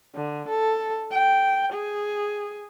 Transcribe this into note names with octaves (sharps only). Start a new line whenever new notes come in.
D3
A4
G5
G#4